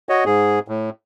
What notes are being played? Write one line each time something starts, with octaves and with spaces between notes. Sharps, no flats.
F#4 C#5 D#5
G#2 G#4
A2